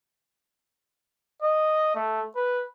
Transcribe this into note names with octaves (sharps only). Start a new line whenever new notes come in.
D#5
A3
B4